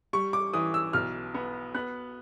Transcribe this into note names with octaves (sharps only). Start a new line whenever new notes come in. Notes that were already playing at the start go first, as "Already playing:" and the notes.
G3 C#6
D6
E3 D#6
E6
B1 F6
B3
B3 F#6